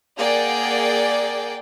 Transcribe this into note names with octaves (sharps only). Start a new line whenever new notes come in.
A#3 G#4 D5 F#5 G5